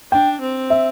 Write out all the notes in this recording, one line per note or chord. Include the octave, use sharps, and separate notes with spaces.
D4 G5
C4
E5